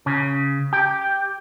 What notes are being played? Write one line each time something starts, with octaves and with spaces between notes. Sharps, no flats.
C#3
G4